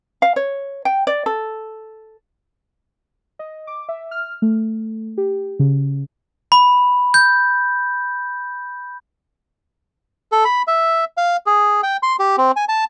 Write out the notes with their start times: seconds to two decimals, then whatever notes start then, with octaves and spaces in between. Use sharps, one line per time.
0.22 F5
0.36 C#5
0.85 G5
1.07 D5
1.26 A4
3.39 D#5
3.67 D6
3.89 E5
4.11 F6
4.42 A3
5.18 G4
5.59 C#3
6.52 B5
7.14 G6
10.32 A4
10.45 B5
10.67 E5
11.17 F5
11.46 G#4
11.83 G5
12.03 C6
12.19 G4
12.38 C4
12.56 G#5
12.69 A5